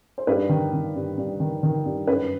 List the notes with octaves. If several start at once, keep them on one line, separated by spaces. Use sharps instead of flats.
C5
G2 B4
D#3
D#3
G2
G2
D#3
D#3
G2
F#2 B4